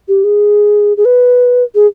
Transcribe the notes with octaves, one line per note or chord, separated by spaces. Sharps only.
G4
G#4
G#4
B4
G#4